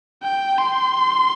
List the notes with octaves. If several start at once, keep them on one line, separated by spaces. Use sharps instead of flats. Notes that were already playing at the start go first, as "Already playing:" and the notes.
G5
C6